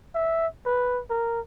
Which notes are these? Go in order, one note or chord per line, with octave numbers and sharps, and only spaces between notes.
E5
B4
A#4